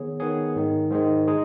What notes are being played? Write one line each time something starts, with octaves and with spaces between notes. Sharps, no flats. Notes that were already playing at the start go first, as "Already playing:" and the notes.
Already playing: D#3 B3 G#4 C#5
D#3 B3 G#4 C#5
G#2 D#3 G#3
G#2 D#3 G#3
G#3 D#4 G#4